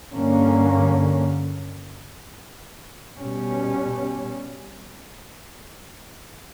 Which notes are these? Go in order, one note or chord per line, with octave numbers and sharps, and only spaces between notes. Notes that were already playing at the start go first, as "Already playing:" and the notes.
G2 D3 A#3 C#4
B2 G3 C#4